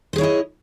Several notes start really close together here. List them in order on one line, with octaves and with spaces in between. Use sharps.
C5 G#4 C#5 E4 D#5